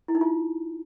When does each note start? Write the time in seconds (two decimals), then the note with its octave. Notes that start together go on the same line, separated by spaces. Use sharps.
0.08 E4
0.15 D#4
0.21 F4